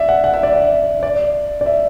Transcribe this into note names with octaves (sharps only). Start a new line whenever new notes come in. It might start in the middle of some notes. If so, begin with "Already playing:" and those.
Already playing: D5 E5
F#5
F#5
E5
D5
E5
D5
D5
E5